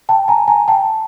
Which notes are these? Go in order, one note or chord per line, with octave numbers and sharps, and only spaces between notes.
G5 A5
G#5 A#5
G#5 A#5
G5 A5